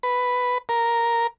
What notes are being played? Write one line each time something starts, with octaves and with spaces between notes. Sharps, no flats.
B4
A#4